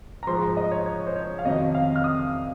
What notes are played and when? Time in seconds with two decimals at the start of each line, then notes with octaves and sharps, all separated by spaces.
0.23 A#5
0.27 G#2 F3 C6
0.42 A#5
0.57 D#5
0.71 C#5
0.86 C#5
1.07 C5
1.16 C#5
1.39 F5
1.45 F2 C3 D#3 F#3 D#5
1.75 F5
1.96 F6
2.04 D#6